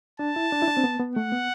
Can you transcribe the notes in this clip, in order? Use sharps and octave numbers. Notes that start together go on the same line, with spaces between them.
D4 A5
E4
D4
E4
D4
C4
B3
B3
A3 F#5
B3